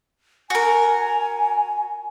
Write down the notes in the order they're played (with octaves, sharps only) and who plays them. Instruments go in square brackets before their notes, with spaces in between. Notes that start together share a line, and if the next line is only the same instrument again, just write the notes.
[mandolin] F#4 A#4 [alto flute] G#5